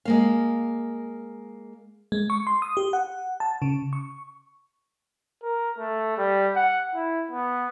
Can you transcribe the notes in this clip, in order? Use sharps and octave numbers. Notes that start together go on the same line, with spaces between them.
G#3 A#3 F5
G#3
C#6
C6
D#6
G4
F#5
A5
C#3
C#6
A#4
A3
G3
F#5
E4
B3